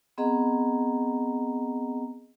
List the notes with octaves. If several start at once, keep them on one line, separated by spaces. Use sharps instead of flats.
B3 C4 G#4 D#5 F#5 A#5